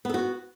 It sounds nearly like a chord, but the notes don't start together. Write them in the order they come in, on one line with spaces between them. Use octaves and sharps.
B3 A4 F#4